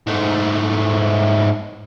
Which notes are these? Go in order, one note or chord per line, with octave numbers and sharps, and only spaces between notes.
G#2 A3